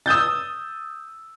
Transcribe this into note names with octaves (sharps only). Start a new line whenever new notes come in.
D#6 E6 G6 A6